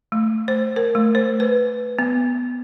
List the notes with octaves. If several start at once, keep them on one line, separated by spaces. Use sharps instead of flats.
A3
C5
A#4
A3
C5
B4
B3